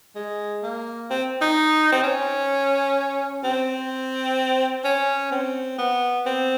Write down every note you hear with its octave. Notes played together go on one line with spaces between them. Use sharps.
G#3
A#3
C4
D#4
C4
C#4
C4
C#4
C4
B3
C4